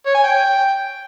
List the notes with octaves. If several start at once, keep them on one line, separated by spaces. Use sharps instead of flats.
C#5
G#5
G5